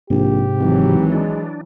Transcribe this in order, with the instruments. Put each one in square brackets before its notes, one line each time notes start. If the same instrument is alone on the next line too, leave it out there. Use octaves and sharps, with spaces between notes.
[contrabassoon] A#1 [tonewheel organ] G#2 C3 [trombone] G4
[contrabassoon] G#1 [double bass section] E3 F#3
[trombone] G#3 [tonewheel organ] D4